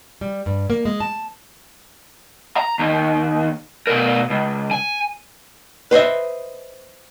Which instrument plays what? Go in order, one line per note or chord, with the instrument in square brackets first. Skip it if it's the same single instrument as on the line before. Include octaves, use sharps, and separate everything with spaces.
[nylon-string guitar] G3
G2
A#3
G#3
A5
[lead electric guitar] A#5
D#2
B2 A#4
C#2
G#5
[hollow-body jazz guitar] B4 C5 D#5 E5